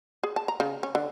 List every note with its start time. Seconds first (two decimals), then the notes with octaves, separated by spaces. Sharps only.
0.24 G#4
0.36 A5
0.48 A#5
0.60 C#3
0.83 C#4
0.95 D3